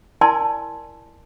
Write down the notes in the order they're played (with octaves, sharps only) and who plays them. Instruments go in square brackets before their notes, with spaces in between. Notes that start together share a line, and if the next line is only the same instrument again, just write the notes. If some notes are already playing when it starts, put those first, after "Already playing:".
[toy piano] E4 A#4 D5 G#5 A5 C6